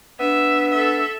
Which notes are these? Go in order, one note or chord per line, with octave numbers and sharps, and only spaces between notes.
B3 D4 E5
A4 E5